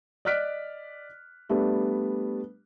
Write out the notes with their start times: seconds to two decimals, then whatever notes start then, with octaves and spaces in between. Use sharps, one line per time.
0.25 D5 D#5 F6 F#6 B6 D7
1.49 G3 A3 B3 D4